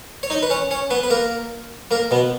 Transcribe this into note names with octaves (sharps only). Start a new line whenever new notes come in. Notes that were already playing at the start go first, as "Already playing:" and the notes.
C#5
D#4 D#5
B4
C#4 C#5
C#4 C#5
B3 B4
B4
A#3 A#4
A#3 A#4
B2 B3